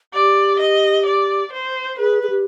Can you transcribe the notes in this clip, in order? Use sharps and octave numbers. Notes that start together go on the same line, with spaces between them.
G4 D5
D#5
D5
C5
G#4 B4
G#4
G4